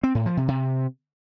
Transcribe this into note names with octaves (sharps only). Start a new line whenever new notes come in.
C4
A2
F3
C3
C3